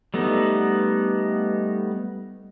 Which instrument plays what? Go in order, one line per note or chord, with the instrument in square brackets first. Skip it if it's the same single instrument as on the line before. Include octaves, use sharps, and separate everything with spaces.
[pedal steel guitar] G3 A3 B3 D#4